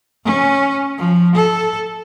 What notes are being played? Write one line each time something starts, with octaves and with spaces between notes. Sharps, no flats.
C#4
F3
A4